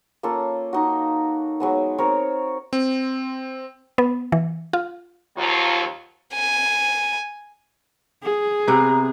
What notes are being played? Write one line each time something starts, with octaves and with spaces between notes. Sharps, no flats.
A#3 C#4 F4 A4
D#4 F#4
F#3 G#3 B3
C4 A#4 C#5
C4
B3
E3
F4
D#2 F3 F#3 F4
G#5
G#4
C3 B3 A#5